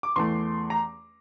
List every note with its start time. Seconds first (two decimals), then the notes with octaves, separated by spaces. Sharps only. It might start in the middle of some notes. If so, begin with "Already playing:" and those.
0.03 D6
0.16 E2 E3 A3 C6
0.70 A#5